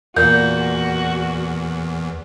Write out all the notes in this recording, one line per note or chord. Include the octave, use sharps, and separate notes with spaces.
E2 A#2 F#4 G6